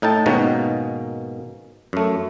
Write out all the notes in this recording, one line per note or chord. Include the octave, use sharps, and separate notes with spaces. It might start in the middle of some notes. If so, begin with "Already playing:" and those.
A2 D#4 G5 A5
G#2 B2 D#3 A#3 C#4 D#4
F#2 A3